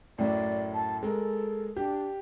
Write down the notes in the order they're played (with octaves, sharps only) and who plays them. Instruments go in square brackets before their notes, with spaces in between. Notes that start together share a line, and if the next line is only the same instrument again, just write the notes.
[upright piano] F#2 A2 [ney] D5
[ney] A5
[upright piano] G#3 A#4 [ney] A4
[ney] D4 [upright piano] G4